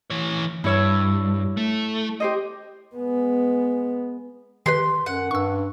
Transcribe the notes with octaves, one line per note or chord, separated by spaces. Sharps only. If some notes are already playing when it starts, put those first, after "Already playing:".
E3 C#5
G2 E4 C#5 E6
A3
G4 C5 D#5
G#3 B3
D#3 G4 B4 C6
F#2 F#5
G2 C#6 E6